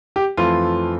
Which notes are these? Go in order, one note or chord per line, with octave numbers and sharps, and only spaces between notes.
G4
F2 E3 A3 F4